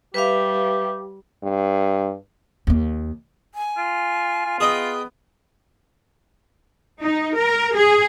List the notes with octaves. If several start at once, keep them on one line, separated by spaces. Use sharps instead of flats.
G3 G4 B4 E5 F5
G2
D#2 A#3
G#5
F4
F4
B3 G#4 D#5 G5
D#4
A#4
G#4